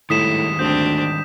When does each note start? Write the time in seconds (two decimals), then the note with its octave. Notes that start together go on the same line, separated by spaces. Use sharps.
0.10 A2 D#3 G3 G#3 D#6 B6 E7
0.59 D2 C4 D4 G6